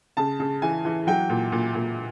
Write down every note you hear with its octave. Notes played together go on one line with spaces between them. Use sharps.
C#3 A5
C#3
E3 G#5
E3
F#3 G5
A#2
A#2
A#2